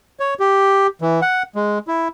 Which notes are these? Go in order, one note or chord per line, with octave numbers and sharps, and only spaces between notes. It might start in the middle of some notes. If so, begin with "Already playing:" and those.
C#5
G4
E3
F#5
G#3
E4